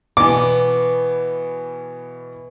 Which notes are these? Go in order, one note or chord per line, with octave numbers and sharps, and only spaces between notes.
B2 E3 B3 D6